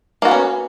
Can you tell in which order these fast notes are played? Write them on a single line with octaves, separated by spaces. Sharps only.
A#3 F#4 B3 C#4